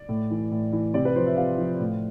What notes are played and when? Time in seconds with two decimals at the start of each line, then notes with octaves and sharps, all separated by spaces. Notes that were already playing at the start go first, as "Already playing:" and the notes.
Already playing: D5
0.09 A2
0.30 E3
0.51 A2
0.72 E3
0.94 C3 D5
1.05 B4
1.15 F3 C5
1.26 E5
1.36 C3 F5
1.58 F3
1.80 A2